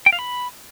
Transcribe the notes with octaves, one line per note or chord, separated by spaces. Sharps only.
G5
F5
B5